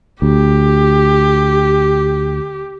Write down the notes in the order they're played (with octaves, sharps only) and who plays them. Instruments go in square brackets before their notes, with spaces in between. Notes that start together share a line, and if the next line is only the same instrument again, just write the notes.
[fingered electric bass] D2 [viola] G4